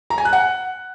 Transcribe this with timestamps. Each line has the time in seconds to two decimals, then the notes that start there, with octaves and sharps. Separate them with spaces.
0.10 A#5
0.18 G#5
0.25 F#6
0.33 F#5